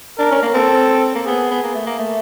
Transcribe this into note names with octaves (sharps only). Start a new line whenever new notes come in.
D4 A#4
C#4
A#3
C4 A4
A#3
B3 G#4
B3
A#3
A3
A#3
A3